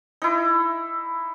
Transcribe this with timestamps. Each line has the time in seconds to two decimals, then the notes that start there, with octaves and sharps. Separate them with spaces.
0.22 D#4 E4